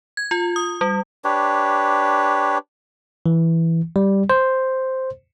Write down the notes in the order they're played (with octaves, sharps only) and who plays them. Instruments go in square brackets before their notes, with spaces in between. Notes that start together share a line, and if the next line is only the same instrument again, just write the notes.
[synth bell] G#6
F4
D#6
G3
[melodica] D4 G4 B4 C#5
[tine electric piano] E3
G3
C5